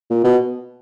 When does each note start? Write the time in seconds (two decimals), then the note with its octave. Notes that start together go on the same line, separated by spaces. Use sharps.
0.10 A#2
0.24 B2